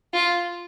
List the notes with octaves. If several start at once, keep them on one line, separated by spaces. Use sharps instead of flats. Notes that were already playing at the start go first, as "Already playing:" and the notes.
F4